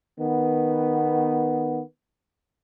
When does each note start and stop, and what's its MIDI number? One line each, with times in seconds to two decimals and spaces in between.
0.20 1.82 51
0.20 1.82 59